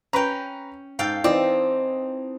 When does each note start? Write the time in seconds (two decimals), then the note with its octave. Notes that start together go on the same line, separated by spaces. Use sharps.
0.13 C#4 B4 G5 A#5
0.99 G#2 A4 F5 G5
1.24 E3 C4 D#4 D5